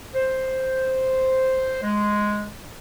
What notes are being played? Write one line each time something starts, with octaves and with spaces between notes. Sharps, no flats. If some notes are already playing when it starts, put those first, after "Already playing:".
C5
G#3